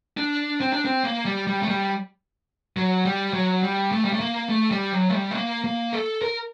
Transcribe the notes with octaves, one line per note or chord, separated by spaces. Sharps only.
D4
C4
D4
C4
A#3
G3
G3
A3
G3
F#3
G3
F#3
G3
A3
G3
A3
A#3
A3
G3
F#3
A3
G3
A3
A#3
A#3
A4
A#4